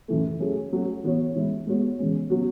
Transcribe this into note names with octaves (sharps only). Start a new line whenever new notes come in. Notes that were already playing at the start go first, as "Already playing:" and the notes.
F#2 E3 A3
F#3 A3 C#4 G#4
F#3 A3 C#4
E3 B3 F#4 C#5
E3 G#3 C#4 E4
G#3 B3 F#4 C#5
E2 C#3 G#3 C#4
C#3 F#3 B3 F#4